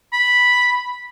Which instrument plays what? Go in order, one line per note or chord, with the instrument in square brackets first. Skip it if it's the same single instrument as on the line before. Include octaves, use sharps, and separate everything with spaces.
[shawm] B5